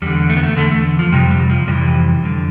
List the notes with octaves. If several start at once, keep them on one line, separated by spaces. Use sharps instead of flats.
E2 D3 G3
A3
B3
A3
E2 D3 A3
A3
F3
F2 C3 G3
G3
F3
F2 C3 E3 G3
F2 D3